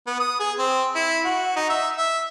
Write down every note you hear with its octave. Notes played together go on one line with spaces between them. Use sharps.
B3
D#6
G#4
C4
E4
F#4
D#4
E5
E5